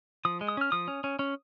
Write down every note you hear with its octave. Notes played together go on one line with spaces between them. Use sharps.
F3 D#6
G#3
D#6
C#4 F6
F3 D#6
C#4
C#4
C#4